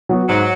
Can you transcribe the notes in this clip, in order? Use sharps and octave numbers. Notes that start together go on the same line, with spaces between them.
F#3 B3 F#4
G#2 F#3